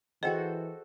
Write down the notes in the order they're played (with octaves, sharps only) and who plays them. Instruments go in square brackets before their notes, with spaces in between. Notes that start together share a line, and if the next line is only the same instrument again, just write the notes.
[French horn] E3 [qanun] F#4 A4 C5 [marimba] G#4 F#5 [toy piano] D#5 G5